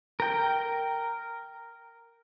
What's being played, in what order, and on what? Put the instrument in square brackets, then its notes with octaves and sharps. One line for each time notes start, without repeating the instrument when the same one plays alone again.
[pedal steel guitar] A#4 G5